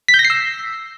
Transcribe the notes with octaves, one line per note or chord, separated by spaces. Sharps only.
B6
G6
A#6
C7
E6